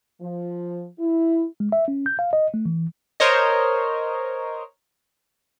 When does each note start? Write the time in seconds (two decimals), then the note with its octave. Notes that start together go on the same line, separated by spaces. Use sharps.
0.20 F3
0.99 E4
1.60 G#3
1.72 E5
1.88 C#4
2.06 G6
2.19 F5
2.33 D#5
2.54 A3
2.66 E3
3.20 A#4 C5 C#5 D#5